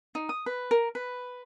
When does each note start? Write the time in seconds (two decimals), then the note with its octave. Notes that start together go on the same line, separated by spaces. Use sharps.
0.15 D#4
0.29 D#6
0.46 B4
0.71 A#4
0.95 B4